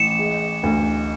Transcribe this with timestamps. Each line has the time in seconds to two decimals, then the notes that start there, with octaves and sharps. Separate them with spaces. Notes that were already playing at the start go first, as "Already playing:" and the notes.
Already playing: A1 E3 C#7 E7
0.19 G#3
0.63 D2